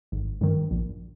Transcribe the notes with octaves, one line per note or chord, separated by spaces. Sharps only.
G#1
G2 D#3
A#1